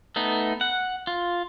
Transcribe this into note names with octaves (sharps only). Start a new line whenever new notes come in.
A3 B3 D#4
F#5
F4